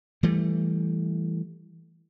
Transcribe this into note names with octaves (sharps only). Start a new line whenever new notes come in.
E3 G3 A3